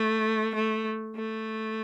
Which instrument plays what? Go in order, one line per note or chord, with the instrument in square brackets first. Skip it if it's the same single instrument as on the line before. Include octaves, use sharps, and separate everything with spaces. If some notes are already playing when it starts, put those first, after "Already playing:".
Already playing: [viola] A3
A3
A3